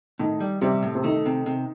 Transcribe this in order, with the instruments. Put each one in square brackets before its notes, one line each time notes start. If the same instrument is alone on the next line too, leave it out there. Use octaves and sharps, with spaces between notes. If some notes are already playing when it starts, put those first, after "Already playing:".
[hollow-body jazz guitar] A2 [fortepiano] D#3
[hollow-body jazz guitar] G3
[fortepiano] C3 [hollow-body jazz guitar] G3
[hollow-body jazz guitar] A2
[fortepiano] C3
[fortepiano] D#3 [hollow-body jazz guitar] A3
[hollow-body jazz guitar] C3
C3